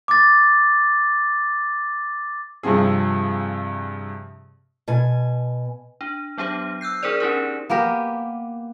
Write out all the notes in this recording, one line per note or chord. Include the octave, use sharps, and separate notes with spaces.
D6 A6
G2 C3 F3 C4 G#4
B2 G#5
D4
F#3 B3 D4 G4 C5
E6 F#6 G6 C7
D4 G#4 A#4 C5 D5
C#4 D#4 G4 A#4
A#3 B3 G4 A#4